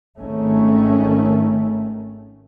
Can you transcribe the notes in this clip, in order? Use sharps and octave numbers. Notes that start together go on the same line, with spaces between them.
G#1 D#3 A3 C#4